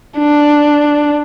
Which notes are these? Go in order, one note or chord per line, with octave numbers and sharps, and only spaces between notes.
D4